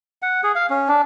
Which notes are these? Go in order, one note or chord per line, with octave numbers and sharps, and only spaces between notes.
F#5
G#4
F5
C#4
D4